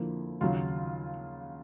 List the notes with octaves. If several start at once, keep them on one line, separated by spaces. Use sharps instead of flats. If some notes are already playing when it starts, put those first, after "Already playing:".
Already playing: F2 D3 F3 A#3 E4
D#2 C#3 F#3 F4